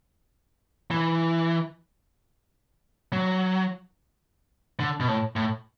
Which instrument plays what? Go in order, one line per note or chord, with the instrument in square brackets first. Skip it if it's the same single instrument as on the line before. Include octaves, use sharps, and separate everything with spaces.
[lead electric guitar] E3
F#3
D3
B2
A2
A2